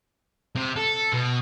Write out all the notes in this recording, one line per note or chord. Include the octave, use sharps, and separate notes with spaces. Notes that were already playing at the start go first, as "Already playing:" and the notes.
C3
A4
B2